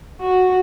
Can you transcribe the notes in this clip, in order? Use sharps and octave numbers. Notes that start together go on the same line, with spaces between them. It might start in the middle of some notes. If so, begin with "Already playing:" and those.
F#4